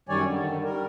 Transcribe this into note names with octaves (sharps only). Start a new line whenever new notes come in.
F#2 D#3 G3 C#5 D5 G#5
D3 D#3
G3 A#4